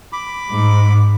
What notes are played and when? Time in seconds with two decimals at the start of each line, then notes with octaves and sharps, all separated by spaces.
0.13 B5 D6
0.54 G#2